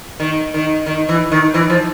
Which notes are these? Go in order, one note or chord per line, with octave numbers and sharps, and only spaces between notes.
D#3
D#3
D#3
E3
D#3
E3
F3